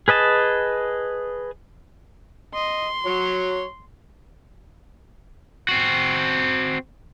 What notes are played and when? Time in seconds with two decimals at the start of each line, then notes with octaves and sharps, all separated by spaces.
0.08 G#4 B4 D#5 A5
2.55 D#5 C6
3.06 F#3 C#5
5.69 C4 F#4